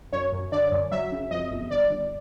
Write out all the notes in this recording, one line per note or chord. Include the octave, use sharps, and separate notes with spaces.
F#2 C#5
F#2
D3 D5
F#2
F#3 E5
C#3
F2 D#5
G1
G1 D5
G1